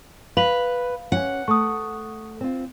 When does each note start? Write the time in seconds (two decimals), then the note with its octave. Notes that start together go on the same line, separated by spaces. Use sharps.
0.37 B4 F5 F7 F#7
1.12 C#4 G4 F#5 G#5
1.48 A3 C#6 D#6
2.41 C4 F4